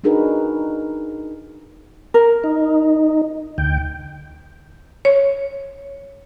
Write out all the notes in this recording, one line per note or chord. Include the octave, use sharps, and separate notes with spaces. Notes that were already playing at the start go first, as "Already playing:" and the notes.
D4 D#4 F#4 G#4 A#4 B4
A#4
D#4
D2 G5
C#5